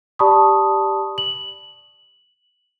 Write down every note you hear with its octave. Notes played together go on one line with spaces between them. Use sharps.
G4 D5 A5 B5 C#6 D#6
F#7